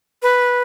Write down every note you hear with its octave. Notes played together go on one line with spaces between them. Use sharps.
B4